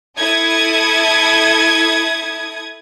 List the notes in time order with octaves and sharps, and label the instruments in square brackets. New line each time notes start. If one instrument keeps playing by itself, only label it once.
[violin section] E4 A4 D#6 G#6